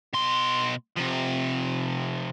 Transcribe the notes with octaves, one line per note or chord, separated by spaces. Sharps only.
B2 C6
C3 F3